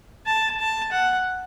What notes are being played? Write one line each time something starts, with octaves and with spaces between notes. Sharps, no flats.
A5
A5
F#5